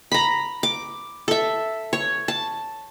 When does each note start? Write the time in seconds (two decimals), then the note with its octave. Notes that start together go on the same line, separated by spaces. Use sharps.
0.12 A#5 B5
0.63 D6
1.28 A4 E5
1.93 C#5
2.28 A5